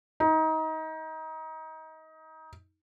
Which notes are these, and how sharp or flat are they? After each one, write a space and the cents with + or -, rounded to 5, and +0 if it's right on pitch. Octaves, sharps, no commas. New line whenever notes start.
D#4 +25